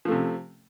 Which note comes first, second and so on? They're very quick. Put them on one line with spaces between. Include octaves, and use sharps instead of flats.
F3 A3 C3